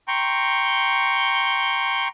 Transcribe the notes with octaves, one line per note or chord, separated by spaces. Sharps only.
G5 A#5 C6 C#6